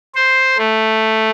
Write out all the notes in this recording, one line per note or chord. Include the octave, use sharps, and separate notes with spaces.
C5
A3